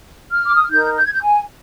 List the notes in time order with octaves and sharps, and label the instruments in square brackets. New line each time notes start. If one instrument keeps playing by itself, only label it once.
[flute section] F6
D6
D#6
F6
D#4 A#4 G6
G6
G#6
G6
G#5